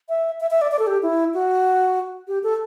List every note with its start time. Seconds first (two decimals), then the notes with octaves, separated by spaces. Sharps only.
0.09 E5
0.40 E5
0.51 E5
0.62 D5
0.72 D5
0.79 A4
0.87 G4
1.03 E4
1.34 F#4
2.28 G4
2.43 A4